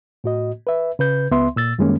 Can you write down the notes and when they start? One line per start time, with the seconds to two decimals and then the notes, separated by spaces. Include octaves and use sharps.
0.24 A2 F#4 D#5
0.67 B4 E5
0.99 C#3 B4 G6
1.31 C#2 B3 E5 C6
1.56 A#2 E6 A6
1.78 F#2 D#3 G3 G#3 A#3 C#4